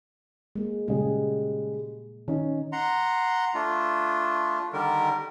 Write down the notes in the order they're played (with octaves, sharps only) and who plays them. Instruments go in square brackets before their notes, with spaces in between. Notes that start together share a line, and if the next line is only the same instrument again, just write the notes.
[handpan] G#3 A#3
[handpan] A#2 G#4 [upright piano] C#3 G3 G#3
[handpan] D#3 [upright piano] C#4 D#4
[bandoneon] F#5 A#5 C6
A3 D4 F4
D3 D#3 G3 A#4